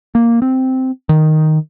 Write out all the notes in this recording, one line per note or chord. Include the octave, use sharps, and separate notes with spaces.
A#3
C4
D#3